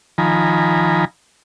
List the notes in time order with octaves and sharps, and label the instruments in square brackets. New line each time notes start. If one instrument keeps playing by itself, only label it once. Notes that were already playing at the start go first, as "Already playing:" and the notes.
[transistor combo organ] D#3 F3 G#5 A#5 B5